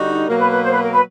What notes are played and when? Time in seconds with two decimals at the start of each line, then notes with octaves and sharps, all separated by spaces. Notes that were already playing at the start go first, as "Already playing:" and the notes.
Already playing: D3 G3 D#4 F#4
0.26 B2 F#3 A#3 A#4
0.38 B4
0.50 B4
0.63 C5
0.72 B4
0.81 A#4
0.91 B4